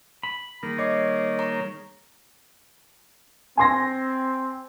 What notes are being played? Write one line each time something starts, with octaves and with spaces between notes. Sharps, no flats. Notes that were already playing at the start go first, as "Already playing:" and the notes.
B5
D#3 G3 A#3 G#4
C#5 D#5 D6 C7
A#5 C#6
C4 G#5 C6 A#6